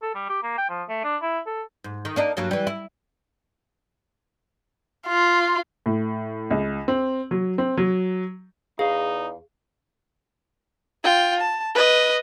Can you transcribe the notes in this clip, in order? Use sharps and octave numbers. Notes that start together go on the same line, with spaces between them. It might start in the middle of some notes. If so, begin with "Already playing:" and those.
A4
G3
G4
A#3
G5
F3
A3
D4
E4
A4
G#2
D#3
A#3 D4 D#4
G2 F#3 A#3
E3 G3
E4
F4
A2
C#2
C4
F#3
C4
F#3
E2 D#4 G#4 F5
F4 G5
A5
B4 D#5